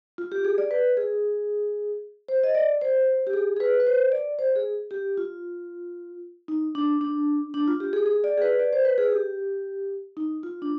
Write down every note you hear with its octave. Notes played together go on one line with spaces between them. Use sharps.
F4
G4
G#4
D5
B4
G#4
C5
D#5
D5
C5
G4
G#4
G#4
B4
B4
C5
D5
C5
G#4
G4
F4
D#4
D4
D4
D4
F4
G4
G#4
G#4
D5
G#4
B4
D5
C5
B4
G#4
G4
D#4
F4
D4